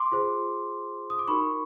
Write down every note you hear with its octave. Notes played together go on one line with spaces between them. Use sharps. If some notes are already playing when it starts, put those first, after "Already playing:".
Already playing: C6 D6
F4 G#4 C5
D#6
D6
D#4 F#4 A#4 B5 C#6